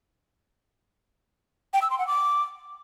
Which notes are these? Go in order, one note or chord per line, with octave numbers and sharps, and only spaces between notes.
G5
E6
C6
F#5
D6